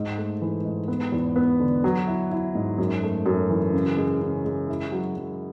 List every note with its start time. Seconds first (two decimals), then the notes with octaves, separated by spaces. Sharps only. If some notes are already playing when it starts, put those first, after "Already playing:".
Already playing: G#2
0.18 A3
0.41 E3
0.65 G#2
0.88 B3
1.12 E2
1.36 B3
1.60 D3
1.84 F#3
2.07 E4
2.31 E4
2.55 G#2
2.78 F#2
3.03 A3
3.26 F#2
3.50 E3
3.73 C#3
3.97 G#3
4.21 C#3
4.45 G#3
4.68 E4
4.92 F#3
5.17 F#3